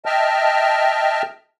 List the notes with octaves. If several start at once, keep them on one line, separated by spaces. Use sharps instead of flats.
D#5 E5 G5 A5 F6